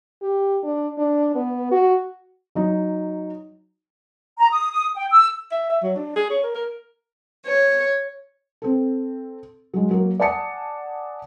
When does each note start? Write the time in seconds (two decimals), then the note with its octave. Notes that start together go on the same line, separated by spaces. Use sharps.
0.22 G4
0.64 D4
0.98 D4
1.35 B3
1.71 F#4
2.55 F#3 D#4
4.38 A#5
4.50 D#6
4.71 D#6
4.95 G5
5.11 E6
5.51 E5
5.70 E5
5.83 F#3
5.96 D4
6.16 G#4
6.30 C#5
6.43 A#4
6.55 A#4
7.46 C#5
8.62 C4 A4
9.74 F#3 G#3
9.91 F#3 A#3
10.20 D5 F#5 G#5 A5 D#6 C#7